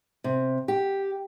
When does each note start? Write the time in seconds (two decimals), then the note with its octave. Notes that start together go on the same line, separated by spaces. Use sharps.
0.24 C3
0.68 G4